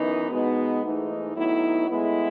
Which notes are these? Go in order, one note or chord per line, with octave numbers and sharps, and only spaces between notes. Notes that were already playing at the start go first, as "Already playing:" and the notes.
Already playing: F#2 E3 B3 D#4
B2 G#3 B3 D#4
G#2 E3 A3 D#4
A2 F#3 B3 D#4 E4
A2 G#3 B3 E4